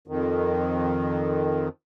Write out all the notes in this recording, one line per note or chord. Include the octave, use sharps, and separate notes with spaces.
F2 D#3